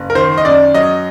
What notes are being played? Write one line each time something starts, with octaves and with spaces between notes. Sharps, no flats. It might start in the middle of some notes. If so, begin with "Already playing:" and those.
Already playing: F#1
A#4
D#3 C5
D#5
F#2 D5
F#3 D#5